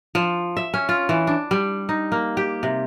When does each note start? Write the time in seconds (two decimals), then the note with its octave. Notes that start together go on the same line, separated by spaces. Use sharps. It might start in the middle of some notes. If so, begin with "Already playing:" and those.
0.15 F3
0.57 E5
0.74 C#4
0.89 F4
1.09 E3
1.27 D4
1.51 G3
1.89 D#4
2.12 A#3
2.37 G4
2.63 C3